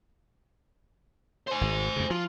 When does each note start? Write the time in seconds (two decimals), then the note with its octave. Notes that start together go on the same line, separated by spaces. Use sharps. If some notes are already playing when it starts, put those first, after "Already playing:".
1.48 C5 G#5
1.61 G#1
1.96 F2 C#3
2.10 F3 F4